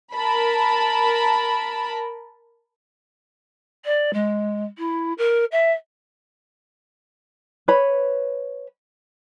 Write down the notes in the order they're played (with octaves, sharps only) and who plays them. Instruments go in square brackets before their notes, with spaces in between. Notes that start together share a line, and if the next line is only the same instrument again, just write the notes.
[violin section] A#4 A5 B5
[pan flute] D5
G#3
E4
A#4
E5
[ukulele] B4 C#5 B5